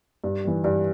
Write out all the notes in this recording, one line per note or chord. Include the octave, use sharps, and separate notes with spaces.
G2
E3 G3
G2